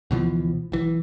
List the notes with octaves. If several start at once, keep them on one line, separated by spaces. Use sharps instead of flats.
D2 B2 E3 F3
B1 E3